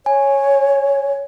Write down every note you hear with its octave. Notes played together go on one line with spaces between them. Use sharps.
C#5 G#5